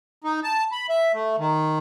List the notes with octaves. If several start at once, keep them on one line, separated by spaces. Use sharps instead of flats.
D#4
A5
B5
E5
A3
D#3